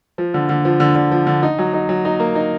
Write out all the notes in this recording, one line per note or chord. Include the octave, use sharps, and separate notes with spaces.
F3
D3
D3
F3
D3
D3
F3
D3
D#4
F#3
D#4
F#3
D#4
A#3
D#4